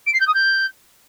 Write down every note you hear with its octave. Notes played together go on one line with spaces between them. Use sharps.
D7
C7
G6
D#6
G6